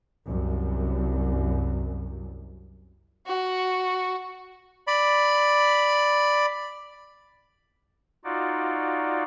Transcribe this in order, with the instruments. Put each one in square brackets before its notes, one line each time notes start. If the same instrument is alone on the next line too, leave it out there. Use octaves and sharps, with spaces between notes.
[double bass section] C2 F#2
[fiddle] F#4
[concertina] D5 B5
[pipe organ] D#4 F4 F#4 D5